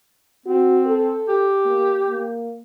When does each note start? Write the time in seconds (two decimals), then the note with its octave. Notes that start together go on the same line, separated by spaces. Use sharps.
0.46 C4 F#4
0.86 A4
1.29 G4
1.65 A#3
2.09 A#3